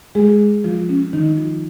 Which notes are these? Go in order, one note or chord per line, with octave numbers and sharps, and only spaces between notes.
G#3 G#4
F3 F4
C#4
D#3 D#4
F3 F4